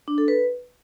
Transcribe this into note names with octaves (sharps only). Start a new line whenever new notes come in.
D4
A4
B4